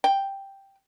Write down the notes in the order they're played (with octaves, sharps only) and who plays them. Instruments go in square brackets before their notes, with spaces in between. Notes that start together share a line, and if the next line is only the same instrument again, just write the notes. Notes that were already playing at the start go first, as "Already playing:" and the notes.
[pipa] G5